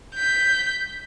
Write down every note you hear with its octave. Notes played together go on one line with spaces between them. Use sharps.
G6 B6